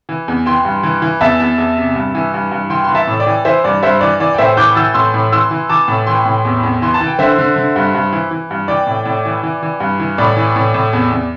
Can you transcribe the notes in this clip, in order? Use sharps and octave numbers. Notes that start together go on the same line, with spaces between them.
E3
E2
E3 G5 C6
G2
E3
E3
E2 E5 A5
E2
E2
C3
G2
E3
G2
G2
E3 G5 C6
E3 C6
E5 A5
A2
D5 G5
E3
E3 C5 E5
G2 D5
G2 C5 E5
E3 D5
E3 D5
G5
A2 C5 E5
E3 D6 G6
E3 E6 A6
A2 C6 E6
A2
E3 C6 E6
E3
E3 A5 D6
A2
E3 G5 C6
A2
E2
E2
E3 C6
A5
E3
G5
D3 C5 E5
D3
D3
G2
G2
E3
E3
G2
E3 D5 G5
A2
A2
E3
E3
E3
G2
E3
A2 D5
E3
A2
A2
E2
E2